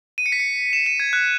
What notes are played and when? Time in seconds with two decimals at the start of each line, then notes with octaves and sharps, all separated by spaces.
0.18 D#7
0.26 C#7
0.32 B6
0.39 C#7
0.73 E7
0.86 D#7
1.00 G#6
1.13 F#6